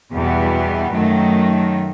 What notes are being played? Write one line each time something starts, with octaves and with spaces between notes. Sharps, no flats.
E2 B2 G3 B3
F#2 D#3 F#3 A3